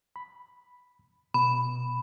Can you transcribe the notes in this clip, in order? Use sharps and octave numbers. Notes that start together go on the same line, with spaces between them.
B5
B2 B5